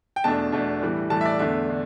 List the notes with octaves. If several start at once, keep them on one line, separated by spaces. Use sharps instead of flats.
G5
E2 B2 A3 D4 A5
E2 B2 A3 D4
A2 E3 G3
A2 E3 G3 A5
E5
D5
E2 D3 A3 D4 E5
D3